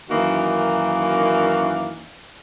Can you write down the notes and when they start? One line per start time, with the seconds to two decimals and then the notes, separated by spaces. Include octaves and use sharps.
0.10 F#2 D#3 E3 A#3 D#4 F#4